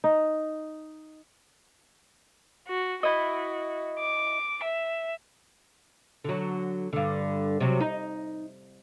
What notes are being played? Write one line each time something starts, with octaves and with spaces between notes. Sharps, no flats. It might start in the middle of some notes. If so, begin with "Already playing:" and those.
D#4
F#4
E4 F#4 D#5
D6
E5
D3 F#3
G2 D3
C3 F#3
D#4